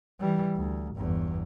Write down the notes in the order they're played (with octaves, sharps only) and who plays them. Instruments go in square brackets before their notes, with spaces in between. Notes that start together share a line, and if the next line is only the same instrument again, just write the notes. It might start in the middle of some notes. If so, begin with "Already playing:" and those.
[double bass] E3 G3
D2
G1 E2